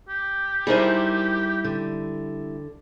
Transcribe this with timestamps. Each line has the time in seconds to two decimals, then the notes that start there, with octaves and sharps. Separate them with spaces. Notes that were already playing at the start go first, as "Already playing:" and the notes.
0.09 G4
0.67 G3 D#4 E4 G#4 A#4 C5
1.64 D3